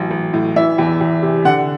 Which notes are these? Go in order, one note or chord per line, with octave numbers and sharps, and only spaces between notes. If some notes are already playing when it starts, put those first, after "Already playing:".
Already playing: A1 F#3
A1
A2
E3 E5
E2
E2
C3
D3 F#5